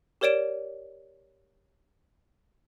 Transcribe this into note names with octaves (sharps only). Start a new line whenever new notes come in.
G4 A#4 C#5 D5 D7 E7